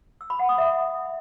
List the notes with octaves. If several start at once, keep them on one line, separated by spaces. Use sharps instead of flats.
E6
B5
F#5
D#6
E5